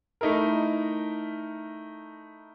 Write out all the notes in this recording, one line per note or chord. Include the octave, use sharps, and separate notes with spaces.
A3 D#4 E4 A#4